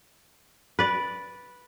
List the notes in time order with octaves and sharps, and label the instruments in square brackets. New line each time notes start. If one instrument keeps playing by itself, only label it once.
[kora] B4 D5